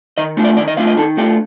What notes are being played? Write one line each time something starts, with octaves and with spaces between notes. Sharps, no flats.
D#3 D#5
A3 D4 F4
D5
D#3 D5
D#5
A3 D4 F4 F5
D#5
D#3 A4
A3 D4 F4 G4